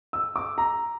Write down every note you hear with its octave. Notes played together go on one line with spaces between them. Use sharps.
E6
D6
A#5